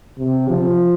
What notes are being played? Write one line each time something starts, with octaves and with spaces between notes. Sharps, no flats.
C3
F3